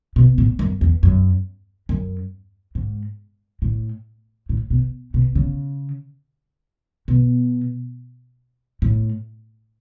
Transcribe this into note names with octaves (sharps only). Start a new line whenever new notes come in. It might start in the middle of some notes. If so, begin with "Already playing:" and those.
B2
A2
F#2
E2
F#2
F#2
G#2
A2
A2
B2
B2
C#3
B2
A2